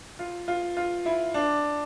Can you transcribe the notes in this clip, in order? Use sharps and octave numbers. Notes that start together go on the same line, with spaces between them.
F4
F4
F4
E4
D4